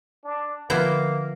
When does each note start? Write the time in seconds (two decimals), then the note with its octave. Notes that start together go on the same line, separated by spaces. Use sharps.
0.24 D4
0.70 D3 F3 A#3 B3 E4 C5